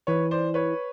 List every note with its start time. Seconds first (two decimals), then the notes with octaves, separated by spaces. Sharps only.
0.07 E3 B4 C#5
0.31 C5 D5
0.54 B4 C#5